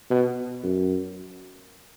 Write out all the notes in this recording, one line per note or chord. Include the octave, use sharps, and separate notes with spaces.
B2
F#2